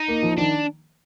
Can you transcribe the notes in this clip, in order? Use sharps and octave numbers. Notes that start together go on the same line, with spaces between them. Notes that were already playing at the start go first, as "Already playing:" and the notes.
Already playing: D#4
A#3
F3
D#3 D4